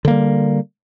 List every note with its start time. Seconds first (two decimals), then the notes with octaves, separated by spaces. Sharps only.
0.05 D3
0.08 A#3
0.10 G3